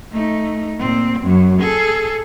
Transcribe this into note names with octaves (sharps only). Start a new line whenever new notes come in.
A3 D#4
A#2 C4
F#2 F#3
G#4 A4